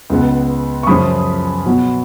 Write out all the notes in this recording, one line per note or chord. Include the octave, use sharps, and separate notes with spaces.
C#2 C#3 G#3 B3
C#6
F#2 C#3 F3 G#3 C#4 B5 D#6
B2 F#3 B3